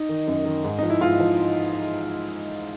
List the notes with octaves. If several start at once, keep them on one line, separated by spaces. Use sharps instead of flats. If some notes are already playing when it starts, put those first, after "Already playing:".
Already playing: D#4
D#3
F#2
D#3
G#2
F3 D#4
E4
G#2 F4
F3